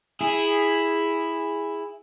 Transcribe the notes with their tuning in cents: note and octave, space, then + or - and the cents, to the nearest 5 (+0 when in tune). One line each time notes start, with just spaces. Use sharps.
E4 +0 G#4 -10